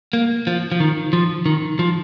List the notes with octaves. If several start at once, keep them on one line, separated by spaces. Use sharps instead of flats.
A#3
F3
F3
D#3
F3
D#3
F3